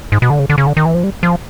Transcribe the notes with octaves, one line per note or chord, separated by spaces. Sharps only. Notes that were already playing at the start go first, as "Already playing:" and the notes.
G#2
B2
D3
C#3
D3
C#3
D3
D#3
E3
F3
G3
F3